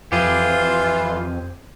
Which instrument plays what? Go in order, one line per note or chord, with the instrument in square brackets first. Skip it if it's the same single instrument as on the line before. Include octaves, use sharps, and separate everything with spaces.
[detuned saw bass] F2 [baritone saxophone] E3 [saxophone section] F4 [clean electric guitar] G4 G#4